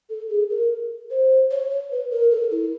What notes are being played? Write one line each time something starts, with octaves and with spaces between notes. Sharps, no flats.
A4
G#4
A#4
C5
C#5
C#5
B4
A#4
A4
E4